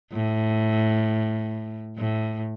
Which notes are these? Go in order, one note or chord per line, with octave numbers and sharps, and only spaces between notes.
A2
A2